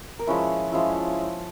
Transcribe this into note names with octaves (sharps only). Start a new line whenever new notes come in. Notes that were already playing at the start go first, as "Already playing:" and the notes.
A#4
F3 G#3 C#4 E4 B4
F3 G#3 C#4 E4